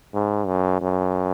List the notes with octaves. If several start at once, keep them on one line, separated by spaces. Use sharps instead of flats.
G#2
F#2
F#2